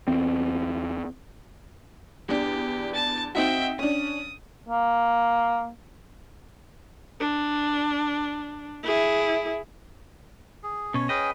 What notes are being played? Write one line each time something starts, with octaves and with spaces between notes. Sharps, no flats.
E2 C4
E2 D4 G4
A5 A6
C4 D#4 F#4 E5 G5
C#4 D4 D#6
A#3
D4
E4 G#4
G#4
B2 C#4 C#5
C#4 G#4 B4 D#5 G5